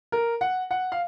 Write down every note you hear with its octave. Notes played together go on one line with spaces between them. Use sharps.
A#4
F#5
F#5
F5